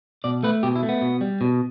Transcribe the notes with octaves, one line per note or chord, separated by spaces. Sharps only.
B2 D5
A3 B4
B2 G4
E4
A3
B3
B2
G3
B2